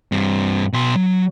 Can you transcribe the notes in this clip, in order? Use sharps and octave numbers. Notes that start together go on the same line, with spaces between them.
G2 C4
B2 C6
F#3